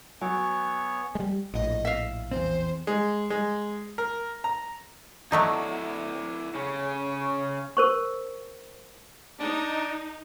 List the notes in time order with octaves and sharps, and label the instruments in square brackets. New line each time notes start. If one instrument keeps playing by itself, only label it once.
[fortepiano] F#3 [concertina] B3 C#5 C#6 [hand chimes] G#5
[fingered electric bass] G3 G#3
[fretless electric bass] A#1 A2 [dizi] D#5
[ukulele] E5 F5
[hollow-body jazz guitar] E2 G2 C4 [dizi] C5
[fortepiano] G#3
G#3
A#4
A#5
[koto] F#3 A3 D#4 [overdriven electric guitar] E4 D5
[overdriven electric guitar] C#3 C#4
[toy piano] A#4 C5 C#6
[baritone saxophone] D4 [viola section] D#4